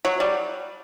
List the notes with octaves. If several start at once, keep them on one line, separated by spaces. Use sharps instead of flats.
F#3
G3